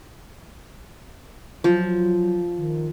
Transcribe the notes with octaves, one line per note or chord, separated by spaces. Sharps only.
F3 F#3
D#3